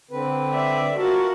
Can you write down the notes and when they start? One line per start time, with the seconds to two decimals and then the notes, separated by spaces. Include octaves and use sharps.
0.11 D3 C4 B4
0.53 D5 E5
0.98 F4 F#4 A#4 A5